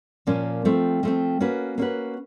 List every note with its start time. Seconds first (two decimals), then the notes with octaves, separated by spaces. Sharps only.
0.27 A#2 F3 A#3 C#4
0.65 F3 A3 C4
1.03 F3 A3 C4
1.41 A#3 C#4 F#4 B4
1.78 A#3 C#4 F#4 B4